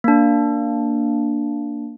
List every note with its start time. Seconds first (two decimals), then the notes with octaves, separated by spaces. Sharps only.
0.04 A#3 D4